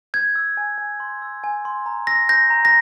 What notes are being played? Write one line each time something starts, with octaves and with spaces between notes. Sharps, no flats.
G6 G#6
E6
G#5
G#5
C6
E6
G#5
C6
A#5
E6 A#6
G6 A#6
A#5
A#6